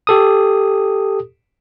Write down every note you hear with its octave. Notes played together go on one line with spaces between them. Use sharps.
G4 A4 D#6